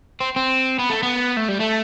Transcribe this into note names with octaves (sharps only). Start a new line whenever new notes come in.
C4
C4
B3
A3
B3
A3
G3
A3